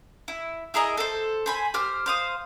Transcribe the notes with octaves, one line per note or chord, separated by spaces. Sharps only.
E4
E4 G#4 A#4 D#5
A4 C5
C5 G#5 B5
G4 C5 F6
C5 F5 D#6